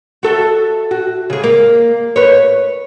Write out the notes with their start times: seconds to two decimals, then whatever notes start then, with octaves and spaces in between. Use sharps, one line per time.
0.23 F#4 A4 E5
0.91 F#4
1.30 C#3 G#4
1.44 A#3
2.16 B4 C#5